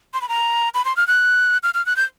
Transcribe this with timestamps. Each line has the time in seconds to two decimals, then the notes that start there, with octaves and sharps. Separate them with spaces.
0.14 C6
0.22 B5
0.29 A#5
0.74 B5
0.85 C6
0.97 F6
1.07 F#6
1.63 F6
1.74 F6
1.86 F#6
1.96 G6